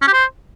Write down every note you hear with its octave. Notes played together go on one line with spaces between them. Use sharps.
C#4
G4
C5